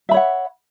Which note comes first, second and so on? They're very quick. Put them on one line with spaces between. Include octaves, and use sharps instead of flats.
E5 B5 C#5 F#5